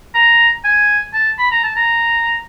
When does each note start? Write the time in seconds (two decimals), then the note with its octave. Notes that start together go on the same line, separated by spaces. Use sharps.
0.15 A#5
0.64 G#5
1.13 A5
1.39 B5
1.51 A#5
1.64 A5
1.76 A#5